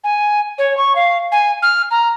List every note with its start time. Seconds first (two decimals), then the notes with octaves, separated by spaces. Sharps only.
0.04 G#5
0.58 C#5
0.77 C#6
0.95 F5
1.32 G#5
1.62 F6
1.91 A#5